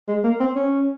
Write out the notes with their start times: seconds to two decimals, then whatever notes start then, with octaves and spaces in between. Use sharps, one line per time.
0.08 G#3
0.24 A#3
0.40 C4
0.56 C#4